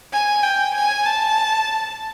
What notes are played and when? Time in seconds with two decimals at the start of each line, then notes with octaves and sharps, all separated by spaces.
0.13 G#5
0.43 G5
0.75 G#5
1.06 A5